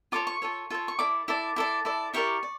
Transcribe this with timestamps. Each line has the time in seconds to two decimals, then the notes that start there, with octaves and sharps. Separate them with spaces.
0.12 F4 A4 C#5 D6
0.27 C#6
0.42 F4 A4 C#5
0.70 F4 A4 C#5
0.88 C#6
0.99 E4 A4 D5 D6
1.28 E4 A4 D5
1.56 E4 A4 D5
1.85 E4 A4 D5
2.14 E4 G4 A#4 D5 C#6
2.43 D5